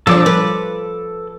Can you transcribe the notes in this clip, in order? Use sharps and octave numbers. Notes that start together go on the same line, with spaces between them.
F3 D4 A4 D6
B4